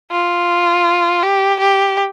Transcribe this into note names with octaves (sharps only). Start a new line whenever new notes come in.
F4
G4
G4